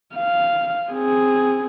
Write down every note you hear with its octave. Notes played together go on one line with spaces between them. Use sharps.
F5
C4 G#4